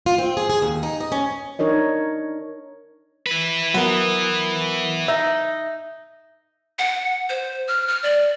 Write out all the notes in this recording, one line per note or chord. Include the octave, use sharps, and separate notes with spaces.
F4
C4
G#4
G#4
D#2
D#4
D#5
C#4
D4 D#4 A#4 C#5 D#5
E4 B4
F#3 B3 A#4
D#4 E5
F#5
C5
F6
F6
D5